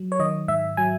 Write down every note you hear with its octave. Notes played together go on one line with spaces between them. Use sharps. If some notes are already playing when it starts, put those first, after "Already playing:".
Already playing: F#3
C#5
D#3 D#5
G#2 E5
F#3 G#5